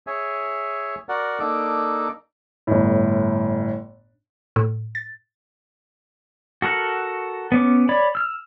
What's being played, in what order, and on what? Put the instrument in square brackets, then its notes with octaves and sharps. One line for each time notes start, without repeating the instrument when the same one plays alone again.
[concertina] G#4 C#5 E5 G#5
F#4 A#4 D5 F#5
A#3 D4 D#4 A4 D6
[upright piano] G1 A2
[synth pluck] A2
A6
[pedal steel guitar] F#4 A4 A#4 F#5
B3 C#4 D6
C#5 D5 B5
E6 F6